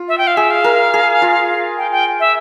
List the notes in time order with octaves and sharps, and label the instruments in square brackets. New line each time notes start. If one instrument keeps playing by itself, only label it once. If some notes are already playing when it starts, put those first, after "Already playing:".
Already playing: [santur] F4
[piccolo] E5
G5
F5
[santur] G#4 [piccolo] E5
[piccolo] F5
[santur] A#4
G#4
F4
[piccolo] G5
G5
E5